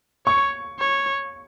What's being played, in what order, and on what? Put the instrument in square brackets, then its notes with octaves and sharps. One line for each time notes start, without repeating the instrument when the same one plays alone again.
[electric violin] C#5 [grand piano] C#6
[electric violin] C#5